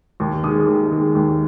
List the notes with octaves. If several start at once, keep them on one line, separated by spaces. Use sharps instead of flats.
D#2
D#3 G#3 D#6
D#2
D#3 G#3
D#2